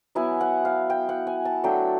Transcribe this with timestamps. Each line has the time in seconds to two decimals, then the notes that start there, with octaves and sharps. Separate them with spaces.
0.15 F#3 B3 E4 G#5
0.41 F#5
0.65 F5
0.90 G5
1.09 F#5
1.27 G#5
1.45 A5
1.64 F#3 A3 D4 G5